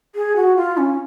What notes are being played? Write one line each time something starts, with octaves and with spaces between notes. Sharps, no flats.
G#4
F#4
F4
C#4